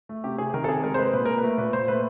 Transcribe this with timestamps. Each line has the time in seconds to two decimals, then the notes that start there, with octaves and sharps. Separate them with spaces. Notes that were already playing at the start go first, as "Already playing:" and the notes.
0.09 A3
0.24 C3 G4
0.38 C3 G#4
0.54 D#3 A#4
0.64 A4
0.68 C3 G#4
0.84 G#3 A#4
0.94 C5
0.98 G#3 B4
1.13 A#2 B4
1.25 A#2 A#4
1.37 B4
1.43 A3
1.58 A#2 B4
1.73 A#2 C5
1.88 A3 B4